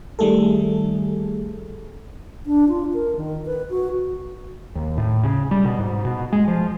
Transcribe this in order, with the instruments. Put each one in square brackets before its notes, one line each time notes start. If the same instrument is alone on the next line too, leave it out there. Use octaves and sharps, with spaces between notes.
[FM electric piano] D#3 G3 A3 G#4 A4
[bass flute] D4
F4
A#4
D#3
B4
F#4
[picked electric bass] D#2
A2
C#3
G3
B2
G#2
B2
G#3
F3